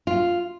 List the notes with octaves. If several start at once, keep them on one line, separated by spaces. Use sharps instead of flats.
F4